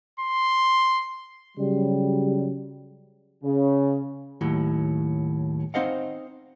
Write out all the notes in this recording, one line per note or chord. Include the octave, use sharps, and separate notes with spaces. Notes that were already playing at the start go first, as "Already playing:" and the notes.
C6
C#3 F#3 G3
C#3
D#2 A2 F#3
C4 D#4 C5 D#5 F5 F#5